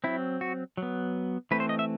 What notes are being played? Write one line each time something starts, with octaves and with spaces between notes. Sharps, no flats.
F#3 C4 E4
F#4
F#3
B3
E3 A3 C4 B4
C5
D#5
E5